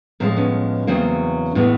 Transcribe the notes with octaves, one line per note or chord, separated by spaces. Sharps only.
A2 F3 G#3 A#3 C4
B3 C#4
E2 C#3 F#3 A#3 C4
A2 E3 G#3 A3 B3